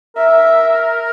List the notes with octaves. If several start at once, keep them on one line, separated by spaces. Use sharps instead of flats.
A#4 E5